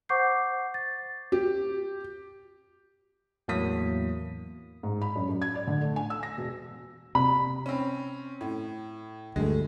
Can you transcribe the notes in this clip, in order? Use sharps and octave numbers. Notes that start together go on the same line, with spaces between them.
C5 F#5 C#6 D6 G6 C7
A6
G4
E2 A2 F#3 A#3 D#6 B6
G#2
B5
F#2
F#2
G#6
D5
D3
A3
G#5
E6
A#6
E1
C3 B5
C4 C#4
A2
D2 G2 G#3 A3